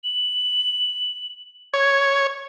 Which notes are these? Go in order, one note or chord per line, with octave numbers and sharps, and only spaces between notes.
F#7
C#5 G#6